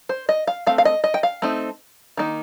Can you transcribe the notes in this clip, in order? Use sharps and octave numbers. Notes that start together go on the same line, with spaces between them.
C5
D#5
F5
A3 C4 F5
F5
D#5
D#5
G5
F5
A3 C4 D#4
D#3 A#3 D#4